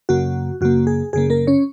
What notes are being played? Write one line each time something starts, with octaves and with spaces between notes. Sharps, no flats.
F#2 C#3 A#3 F#4
F#2 C#3 A#3 F#4
G#4
F#2 C#3 A#3 G#4
A#3 A#4
C#4 C#5